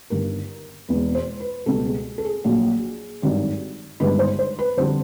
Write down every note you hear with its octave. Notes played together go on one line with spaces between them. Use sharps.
G1 G2 D#3 A#4
E1 E2 B2 G#3 B4
C5
B4
C#2 B2 G3 A4
G#4
A4
G#4
A#1 A#2 F#3
G#1 G2 D#3 F#3
G1 G2 D#3 G#3 B4
C5
C5
B4
F2 D3 G3 C5